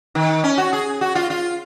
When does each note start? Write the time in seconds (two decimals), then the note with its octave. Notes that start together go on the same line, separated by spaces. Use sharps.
0.15 D#3
0.44 C#4
0.58 F#4
0.73 G#4
1.01 F#4
1.15 F4
1.30 F4